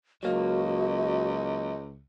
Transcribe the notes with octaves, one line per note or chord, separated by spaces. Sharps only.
C#2 F#3 A#3 F#4 D#5